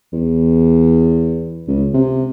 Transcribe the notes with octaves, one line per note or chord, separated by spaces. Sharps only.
E2
C#2
C3